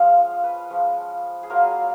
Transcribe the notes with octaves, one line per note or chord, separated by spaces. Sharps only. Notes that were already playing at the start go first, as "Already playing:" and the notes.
Already playing: F3 G#3 C#4 F5
D#5
B4
F3 G#3 C#4
G#4
F#3 A#3 F4 A#4